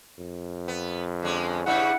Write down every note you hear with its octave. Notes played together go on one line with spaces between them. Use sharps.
F2
B3
D3 G#3 C#4
G2 C#3 G3 E4 F#5